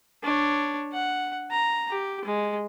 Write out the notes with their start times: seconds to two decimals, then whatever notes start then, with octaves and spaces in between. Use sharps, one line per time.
0.23 D4 C#5
0.93 F#5
1.51 A#5
1.91 G4
2.25 G#3